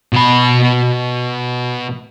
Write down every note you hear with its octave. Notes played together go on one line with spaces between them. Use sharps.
B2 B5